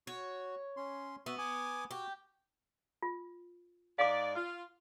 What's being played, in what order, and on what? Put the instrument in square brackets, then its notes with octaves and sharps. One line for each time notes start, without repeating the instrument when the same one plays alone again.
[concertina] F#4 [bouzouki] C#5
[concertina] C#4 C6
[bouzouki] B3 [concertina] F#4 E5
[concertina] G#5 D6 D#6
[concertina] F#4 [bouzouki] G4
[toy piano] F4
[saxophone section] G#2 D#4 D5 [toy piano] F5 D6
[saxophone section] F4